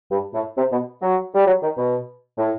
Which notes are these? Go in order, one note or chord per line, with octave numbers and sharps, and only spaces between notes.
G2
A2
C3
B2
F#3
G3
F#3
D#3
B2
A2